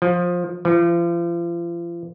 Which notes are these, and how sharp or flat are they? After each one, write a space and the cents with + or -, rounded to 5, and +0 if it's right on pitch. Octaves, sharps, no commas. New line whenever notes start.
F3 +15
F3 -40